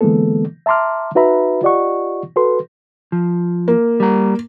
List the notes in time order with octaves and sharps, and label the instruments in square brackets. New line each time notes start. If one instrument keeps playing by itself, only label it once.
[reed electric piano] D3 E3 G#3 A#3 B3 A4
E5 A5 A#5 C6 D6 F6
D#4 F#4 B4 E5 A#5 B5
F4 G4 D5 D#5 F#5 C#6
F#4 A4 B4 C6
[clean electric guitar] F3
[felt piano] A#3
[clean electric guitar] G3 A#5